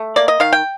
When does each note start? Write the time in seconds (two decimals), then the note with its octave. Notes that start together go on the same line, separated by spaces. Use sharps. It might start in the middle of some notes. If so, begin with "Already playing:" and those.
Already playing: A3
0.16 A#3 D5
0.28 D#5
0.40 D#3 F5
0.53 G5